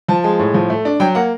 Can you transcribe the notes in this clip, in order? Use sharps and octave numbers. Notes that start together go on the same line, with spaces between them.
F3 A5
G#3
A2
F3
A3
D4
F#3 G5
A#3 F#5